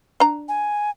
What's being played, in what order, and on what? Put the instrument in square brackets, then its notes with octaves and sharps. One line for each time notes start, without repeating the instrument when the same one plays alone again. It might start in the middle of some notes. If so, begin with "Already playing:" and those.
[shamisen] D4 A#5
[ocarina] G#5